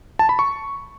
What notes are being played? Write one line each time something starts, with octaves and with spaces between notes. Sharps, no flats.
A5
B5
C#6